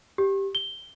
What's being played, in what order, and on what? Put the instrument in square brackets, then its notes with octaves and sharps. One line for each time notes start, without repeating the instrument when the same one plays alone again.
[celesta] G4
G7